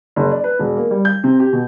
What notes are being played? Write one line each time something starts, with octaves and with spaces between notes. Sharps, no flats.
F#1
D5
B4
E1
A#3
G3
G6
C3
G4
B2